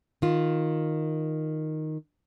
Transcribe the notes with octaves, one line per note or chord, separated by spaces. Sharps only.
D#3 F4